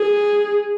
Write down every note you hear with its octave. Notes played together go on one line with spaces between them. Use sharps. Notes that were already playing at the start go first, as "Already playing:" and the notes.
Already playing: G#4